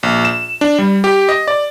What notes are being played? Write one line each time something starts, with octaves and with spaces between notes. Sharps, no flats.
A#1
E7
D4
G3
G4
D#5
D5